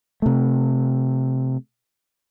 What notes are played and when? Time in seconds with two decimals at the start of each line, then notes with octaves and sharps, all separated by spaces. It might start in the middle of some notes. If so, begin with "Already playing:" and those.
0.22 C3 A3